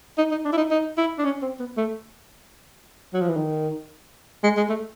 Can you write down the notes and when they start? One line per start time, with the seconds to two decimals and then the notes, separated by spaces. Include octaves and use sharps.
0.18 D#4
0.31 D#4
0.45 D4
0.53 E4
0.58 D#4
0.70 D#4
0.98 E4
1.18 D4
1.24 C#4
1.42 C4
1.59 B3
1.77 A3
3.13 F#3
3.21 F3
3.29 E3
3.37 D#3
4.44 G#3
4.57 G#3
4.70 A3